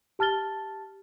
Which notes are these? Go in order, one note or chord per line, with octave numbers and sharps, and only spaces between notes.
G4 A5 F6 A6 G7